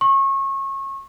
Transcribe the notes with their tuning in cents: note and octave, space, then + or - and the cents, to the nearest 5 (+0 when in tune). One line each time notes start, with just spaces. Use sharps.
C#6 -30